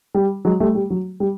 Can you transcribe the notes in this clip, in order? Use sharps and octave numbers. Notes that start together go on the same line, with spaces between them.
G3
F#3 G#3
G3 A3
G3
F#3
G3